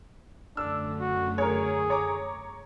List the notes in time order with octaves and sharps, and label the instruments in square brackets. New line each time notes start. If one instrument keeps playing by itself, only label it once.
[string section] F#2 D3 A3 [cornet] D4 [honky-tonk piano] E6
[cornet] F#4
[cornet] G#4 [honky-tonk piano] A#4 C#5
[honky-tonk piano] C#5 A#5 D6